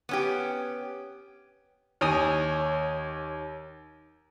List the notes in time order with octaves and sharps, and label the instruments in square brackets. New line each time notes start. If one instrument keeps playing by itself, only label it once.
[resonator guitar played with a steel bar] B3 C#4 G4
[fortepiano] D#2 C#5 G#5 D#6